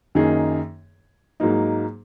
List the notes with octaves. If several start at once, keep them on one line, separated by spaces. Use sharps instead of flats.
F#2 D#3 A#3 D#4 G#4
G#2 F#3 A#3 D#4